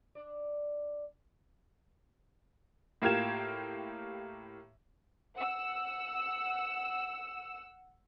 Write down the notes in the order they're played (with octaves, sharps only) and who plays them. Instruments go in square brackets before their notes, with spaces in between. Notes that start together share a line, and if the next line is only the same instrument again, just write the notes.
[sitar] D4 D5
[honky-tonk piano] A2 A#3 F4 G4 G#6 E7
[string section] F#5 E6